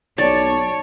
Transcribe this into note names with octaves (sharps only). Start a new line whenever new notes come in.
B1 C#5 D5 A5